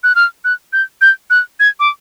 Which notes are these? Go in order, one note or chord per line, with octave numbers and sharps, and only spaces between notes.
F#6
F6
F#6
G6
G6
F#6
G#6
D6